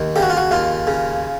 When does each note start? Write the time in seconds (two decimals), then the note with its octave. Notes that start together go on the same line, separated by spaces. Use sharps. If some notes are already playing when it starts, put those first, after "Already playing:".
Already playing: D#2 D#3
0.16 C#3 G4
0.22 F#4
0.30 F4
0.37 F#4
0.51 D#2 F4
0.87 C#3